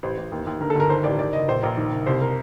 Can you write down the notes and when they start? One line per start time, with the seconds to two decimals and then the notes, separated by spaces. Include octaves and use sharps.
0.03 A1 C5
0.17 A1
0.32 D#2
0.47 D#2
0.61 D3 A#4
0.70 A4
0.75 G1 A#4
0.89 D#3 C5
1.04 A1 D5
1.18 D#3 D5
1.33 F#1 D#5
1.48 A#1 C5
1.62 A#1 A#4
1.77 D#3
1.92 F#1
2.06 C2 C5
2.21 A#4